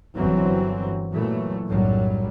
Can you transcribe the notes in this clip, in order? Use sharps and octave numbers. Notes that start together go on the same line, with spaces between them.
G1 E3 F#3 C4
A#2 E3 F#3 A3
B1 F#2 A2 F#3 G3